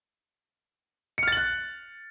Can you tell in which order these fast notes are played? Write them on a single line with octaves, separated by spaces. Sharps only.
C#7 F6 A6 F#7 F#6